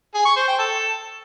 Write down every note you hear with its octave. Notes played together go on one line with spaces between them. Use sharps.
G#4
C#6
C5
G5
A4